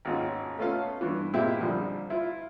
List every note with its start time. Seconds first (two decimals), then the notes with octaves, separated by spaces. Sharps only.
0.05 G#1 D#2 C#4 F4 F#4
0.58 A3 B3 C#4 F4 A4 F5
1.01 G2 E3
1.33 A#2 G#3 A#3 C4 E4 G4
1.60 A#1 D3 F3 G3
2.10 E4 F4